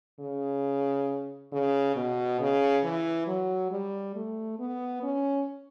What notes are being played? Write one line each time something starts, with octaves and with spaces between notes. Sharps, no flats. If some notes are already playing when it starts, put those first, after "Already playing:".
C#3
C#3
B2
C#3
E3
F#3
G3
A3
B3
C#4